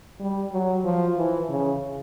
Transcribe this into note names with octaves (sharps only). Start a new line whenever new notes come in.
G3
F#3
F3
E3
C#3